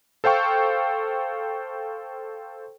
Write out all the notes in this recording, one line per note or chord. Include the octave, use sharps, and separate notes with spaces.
A4 C5 F5 G5 C#6